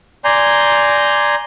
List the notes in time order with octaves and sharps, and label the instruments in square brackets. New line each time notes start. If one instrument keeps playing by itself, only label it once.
[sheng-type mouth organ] D5 G#5 A#5 C6 G6